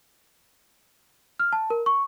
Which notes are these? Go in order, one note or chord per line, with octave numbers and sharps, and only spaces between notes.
F6
A5
A#4
C#6